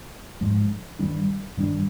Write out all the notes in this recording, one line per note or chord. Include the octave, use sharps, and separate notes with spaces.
G#2 F3 G#3
G2 D#3 G3 D4
G2 D#3 G3 D4